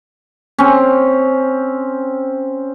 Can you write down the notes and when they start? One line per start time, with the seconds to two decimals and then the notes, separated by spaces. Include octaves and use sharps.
0.58 C4 C#4